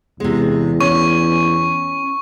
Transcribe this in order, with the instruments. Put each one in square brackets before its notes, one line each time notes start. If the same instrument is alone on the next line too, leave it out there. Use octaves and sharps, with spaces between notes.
[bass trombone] E2 [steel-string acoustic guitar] C3 G#3
[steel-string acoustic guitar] C#4 [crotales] C#6